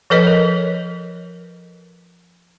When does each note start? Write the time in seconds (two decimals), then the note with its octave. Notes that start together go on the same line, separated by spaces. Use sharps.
0.10 F3 A4 B4 C#5 D#5
0.27 A#4